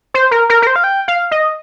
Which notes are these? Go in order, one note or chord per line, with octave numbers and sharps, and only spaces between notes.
C5
A#4
A#4
A#4
C5
F5
G5
F5
D#5